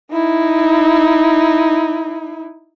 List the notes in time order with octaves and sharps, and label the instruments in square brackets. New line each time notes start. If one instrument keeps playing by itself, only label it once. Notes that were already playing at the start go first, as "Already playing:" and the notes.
[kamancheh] D#4 E4